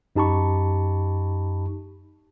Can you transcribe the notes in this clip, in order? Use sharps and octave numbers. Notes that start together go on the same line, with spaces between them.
F#2 D#4 G4 A5 B5 C#6